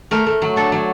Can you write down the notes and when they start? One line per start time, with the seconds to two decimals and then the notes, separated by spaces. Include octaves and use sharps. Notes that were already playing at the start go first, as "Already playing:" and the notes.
0.11 A3 A#4
0.26 A3
0.42 F#3
0.56 D4 A4
0.72 F#3